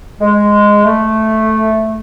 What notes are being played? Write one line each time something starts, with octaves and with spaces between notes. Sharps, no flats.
G#3
A3